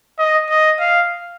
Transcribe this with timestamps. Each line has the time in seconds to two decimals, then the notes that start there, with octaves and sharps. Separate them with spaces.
0.19 D#5
0.50 D#5
0.80 F5